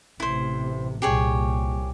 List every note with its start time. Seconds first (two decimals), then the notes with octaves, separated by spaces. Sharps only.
0.20 A1 C3 E4 C5
1.02 C2 A#2 G4 G#4 C#5